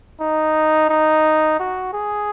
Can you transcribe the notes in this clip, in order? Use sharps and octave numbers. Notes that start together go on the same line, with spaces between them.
D#4
D#4
F#4
G#4